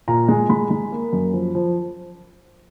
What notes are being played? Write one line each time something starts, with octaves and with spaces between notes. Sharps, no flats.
A#2 A#5
G#3
G#3 B5
G#3
A#3
F#2
F3
F3